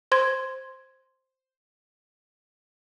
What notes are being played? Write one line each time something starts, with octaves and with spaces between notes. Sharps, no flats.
C5 C6 G#6